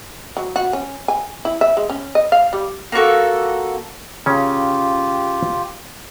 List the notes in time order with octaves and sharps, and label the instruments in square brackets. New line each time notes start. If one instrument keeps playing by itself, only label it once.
[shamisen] F#3
F#4
C#4
G#5
E4
E5
G#3
C#4
D#5
F5
G3
[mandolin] A#3 F4 F#4 A4
[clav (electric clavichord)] C#3 C#4 [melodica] F4 G4